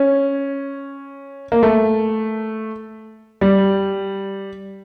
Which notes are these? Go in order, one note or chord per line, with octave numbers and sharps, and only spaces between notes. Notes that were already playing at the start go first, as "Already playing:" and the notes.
Already playing: C#4
A#3
A3
G3